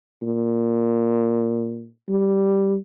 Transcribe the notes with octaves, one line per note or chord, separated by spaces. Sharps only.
A#2
G3